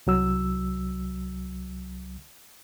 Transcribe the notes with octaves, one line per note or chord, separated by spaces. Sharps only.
C2 F#3 E6